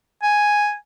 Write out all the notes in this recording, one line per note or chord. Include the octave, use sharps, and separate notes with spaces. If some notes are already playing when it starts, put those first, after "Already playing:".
G#5